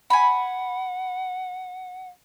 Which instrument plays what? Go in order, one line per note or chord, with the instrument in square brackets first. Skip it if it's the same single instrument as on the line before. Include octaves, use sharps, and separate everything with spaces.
[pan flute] F#5 [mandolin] G#5 B5